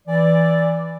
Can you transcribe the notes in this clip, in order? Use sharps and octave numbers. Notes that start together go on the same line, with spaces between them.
E3 D5